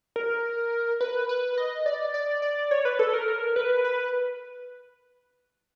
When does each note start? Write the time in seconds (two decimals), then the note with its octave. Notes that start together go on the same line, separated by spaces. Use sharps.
0.16 A#4
1.01 B4
1.29 B4
1.58 D#5
1.86 D5
2.14 D5
2.42 D5
2.71 C#5
2.85 B4
2.99 A4
3.14 A#4
3.28 A#4
3.56 B4
3.84 B4